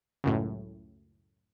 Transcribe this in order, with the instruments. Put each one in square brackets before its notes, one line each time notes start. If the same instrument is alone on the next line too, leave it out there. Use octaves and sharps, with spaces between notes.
[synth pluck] C#2 F#2 A2